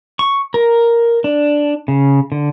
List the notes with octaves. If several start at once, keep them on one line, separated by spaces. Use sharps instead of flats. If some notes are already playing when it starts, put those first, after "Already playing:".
C#6
A#4
D4
C#3
D3